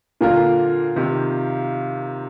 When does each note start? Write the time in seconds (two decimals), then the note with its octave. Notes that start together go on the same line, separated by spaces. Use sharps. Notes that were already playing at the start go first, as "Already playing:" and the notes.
0.21 A#2 D3 A#3 F4 A#4
0.96 C3 D#3